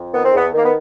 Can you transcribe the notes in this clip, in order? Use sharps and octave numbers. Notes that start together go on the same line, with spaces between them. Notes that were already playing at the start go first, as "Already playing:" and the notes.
Already playing: F2
D#3 B3
C4
E2 B3
D#3 A#3
B3